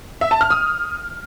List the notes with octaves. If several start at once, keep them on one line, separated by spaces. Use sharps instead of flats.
E5
A5
F6
D#6